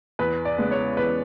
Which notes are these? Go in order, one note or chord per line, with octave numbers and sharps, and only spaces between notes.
E2 B4
D5
C#3 G#3 B3
C#5
E2 B4